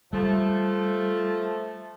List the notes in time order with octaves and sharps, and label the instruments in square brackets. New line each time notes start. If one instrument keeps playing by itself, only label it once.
[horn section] F3 A3 [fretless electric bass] G3